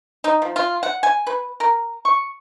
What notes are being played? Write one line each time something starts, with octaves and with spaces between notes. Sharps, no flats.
D#4
F3
F4
F#5
G#5
B4
A#4
C#6